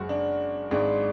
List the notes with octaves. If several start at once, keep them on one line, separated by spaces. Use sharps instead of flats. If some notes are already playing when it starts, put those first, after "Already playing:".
Already playing: F#1 F#2 G#3 F#4
D4
G#1 G#2 G#3 D4